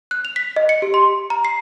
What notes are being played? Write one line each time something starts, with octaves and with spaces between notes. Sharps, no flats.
F#6
F7
B6
D#5
C#7
G4
C6
C6
A#5
C7